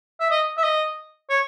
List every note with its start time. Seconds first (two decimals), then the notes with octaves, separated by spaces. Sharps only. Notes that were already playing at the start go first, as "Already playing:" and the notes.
0.20 E5
0.31 D#5
0.57 E5
0.63 D#5
1.30 C#5